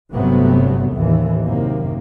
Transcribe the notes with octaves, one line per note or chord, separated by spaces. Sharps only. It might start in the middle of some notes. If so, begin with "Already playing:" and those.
G1 G2 C3 F#3 A3 B3
A1 D#2 E3
F#2 C3 D#3 A#3